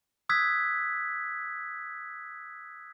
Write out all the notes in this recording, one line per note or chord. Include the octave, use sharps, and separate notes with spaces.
D#6 E6 F#6 G#6 B6